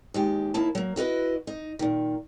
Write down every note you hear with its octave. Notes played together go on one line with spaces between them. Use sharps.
D#2 G#3 G4
D#2 A#3 E4 A5
F#3 A#3
E4 F#4 B4 D#5
D#4
A#2 D#3